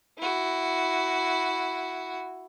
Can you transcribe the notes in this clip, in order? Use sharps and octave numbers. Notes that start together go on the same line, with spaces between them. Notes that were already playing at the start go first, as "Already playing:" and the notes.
E4 F#4